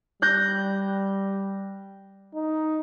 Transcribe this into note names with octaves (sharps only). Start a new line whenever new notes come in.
G3 F#6 G6 A#6
D#4